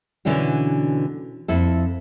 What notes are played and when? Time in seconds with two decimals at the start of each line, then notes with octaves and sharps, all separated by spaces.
0.25 B2 D3 E3 C#4 D4 F#4
1.48 F2 E4 A4